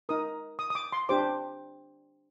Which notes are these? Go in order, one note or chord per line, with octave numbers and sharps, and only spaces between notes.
D#4 A#4 D#6
D#6
D#6
D6
C6
D4 G4 C5 D6